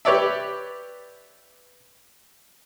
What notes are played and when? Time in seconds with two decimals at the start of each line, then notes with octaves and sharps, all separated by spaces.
0.05 G4 B4 C#5 D5 E5